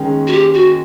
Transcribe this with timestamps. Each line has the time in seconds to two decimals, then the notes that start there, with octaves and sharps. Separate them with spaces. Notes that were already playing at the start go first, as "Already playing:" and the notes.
Already playing: D#3 G#3 C#4
0.27 F#4
0.32 G4
0.54 F#4